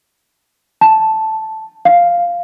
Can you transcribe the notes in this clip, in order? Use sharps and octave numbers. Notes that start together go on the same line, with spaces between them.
A5
F5